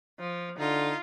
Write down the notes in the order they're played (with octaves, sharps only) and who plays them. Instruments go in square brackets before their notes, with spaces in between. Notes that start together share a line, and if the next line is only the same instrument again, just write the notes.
[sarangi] F3
[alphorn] D3 [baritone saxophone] D#4 [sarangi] F4